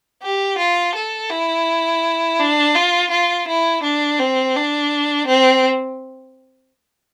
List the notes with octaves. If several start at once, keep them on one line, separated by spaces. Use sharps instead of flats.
G4
F4
A4
E4
D4
F4
F4
E4
D4
C4
D4
C4